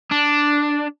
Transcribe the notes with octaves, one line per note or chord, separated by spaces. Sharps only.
D4